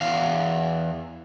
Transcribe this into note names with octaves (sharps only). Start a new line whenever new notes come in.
E2 F5